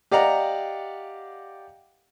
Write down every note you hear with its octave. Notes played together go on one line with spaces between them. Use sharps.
G4 D5 D#5 F5 F#5 A#5